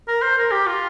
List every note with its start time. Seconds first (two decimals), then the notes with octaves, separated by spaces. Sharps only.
0.08 A#4
0.22 C5
0.38 A#4
0.52 G4
0.67 F4